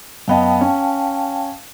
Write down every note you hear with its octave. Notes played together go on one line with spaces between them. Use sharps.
F#2 B3 D#5 F5 G5 A5
C#4